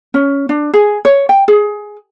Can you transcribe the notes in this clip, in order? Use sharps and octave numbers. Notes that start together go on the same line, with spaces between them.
C#4
D4
G#4
C#5
G5
G#4